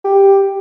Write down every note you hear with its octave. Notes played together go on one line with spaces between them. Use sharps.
G4